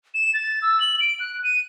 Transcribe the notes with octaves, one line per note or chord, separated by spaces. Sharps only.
E7
A6
E6
F#7
D7
F#6
D#7